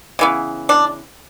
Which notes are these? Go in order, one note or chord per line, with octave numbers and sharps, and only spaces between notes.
C#3 E3 B3
D4